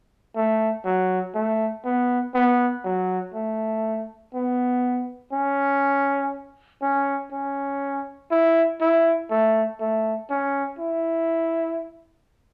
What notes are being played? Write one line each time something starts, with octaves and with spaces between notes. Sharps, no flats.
A3
F#3
A3
B3
B3
F#3
A3
B3
C#4
C#4
C#4
E4
E4
A3
A3
C#4
E4